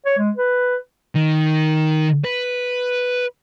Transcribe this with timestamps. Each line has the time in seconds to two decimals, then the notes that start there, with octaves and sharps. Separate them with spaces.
0.06 C#5
0.18 G#3
0.37 B4
1.15 D#3
2.25 B4